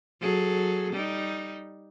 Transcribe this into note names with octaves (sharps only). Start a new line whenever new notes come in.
F#3 G#4 A4
G3 D#4